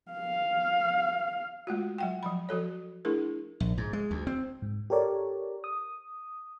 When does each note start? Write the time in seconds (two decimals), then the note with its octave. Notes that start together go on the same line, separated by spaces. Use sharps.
0.12 F5
1.67 G#3 A3 F4 F#4
1.98 F#3 F#5 G5
2.23 F3 F#3 B5
2.49 F3 F#4 A4 C#5
3.05 A3 D4 E4 G#4 A#4
3.60 A#1
3.78 G#2
3.93 G#3
4.11 D2
4.27 C4
4.62 G#2
4.90 G4 A4 A#4 C#5 D5
5.64 D#6